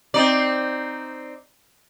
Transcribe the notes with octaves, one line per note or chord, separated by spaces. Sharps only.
C4 D#4 D5